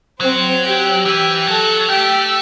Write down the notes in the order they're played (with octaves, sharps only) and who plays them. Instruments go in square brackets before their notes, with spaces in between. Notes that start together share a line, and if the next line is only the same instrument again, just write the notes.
[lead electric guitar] F#3 [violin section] C4 C5
[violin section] G4 G5
[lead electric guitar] E3 [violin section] G4 G5
[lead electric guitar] F#3 [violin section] A4 A5
[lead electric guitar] A3 [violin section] G4 G5